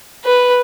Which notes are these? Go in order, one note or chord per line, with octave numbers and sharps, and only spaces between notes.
B4